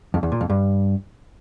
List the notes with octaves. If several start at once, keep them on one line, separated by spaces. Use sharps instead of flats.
F2
E2
A#2
F2
G2